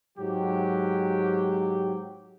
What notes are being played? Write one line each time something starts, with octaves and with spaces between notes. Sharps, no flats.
G#2 F#3 G4